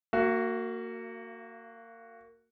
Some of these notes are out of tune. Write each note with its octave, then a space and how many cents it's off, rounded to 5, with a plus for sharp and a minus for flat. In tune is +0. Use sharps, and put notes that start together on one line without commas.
A#3 -25 F#4 +0 F5 -45